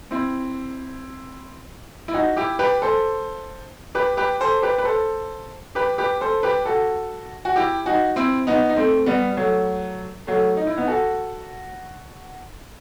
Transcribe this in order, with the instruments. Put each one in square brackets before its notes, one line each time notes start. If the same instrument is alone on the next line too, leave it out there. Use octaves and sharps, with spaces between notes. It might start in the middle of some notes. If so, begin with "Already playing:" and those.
[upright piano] C4 E4
E4
D#4 F#4
E4 G4
G4 B4
A4 C5
G4 B4
G4 B4
A4 C5
G4 B4
B4
A4 C5
G4 B4
G4 B4
A4 C5
G4 B4
F#4 A4
F#4
E4 G4
D#4 F#4
C4 E4
B3 D#4
D#4
A3 C4
G3 B3
F#3 A3
F#3 A3
D#4
E4
B3 D#4
F#4 A4